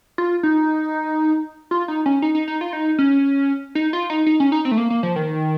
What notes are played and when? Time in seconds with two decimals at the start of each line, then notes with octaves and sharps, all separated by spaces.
0.18 F4
0.43 D#4
1.71 F4
1.88 D#4
2.06 C#4
2.22 D#4
2.35 D#4
2.48 D#4
2.61 F4
2.73 D#4
2.99 C#4
3.75 D#4
3.93 F4
4.10 D#4
4.26 D#4
4.40 C#4
4.52 D#4
4.65 C4
4.71 A3
4.77 A#3
4.90 A#3
5.03 F3
5.16 D#3